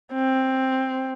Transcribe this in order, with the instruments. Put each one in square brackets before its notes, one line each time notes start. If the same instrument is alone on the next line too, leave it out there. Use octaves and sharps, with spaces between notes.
[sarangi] C4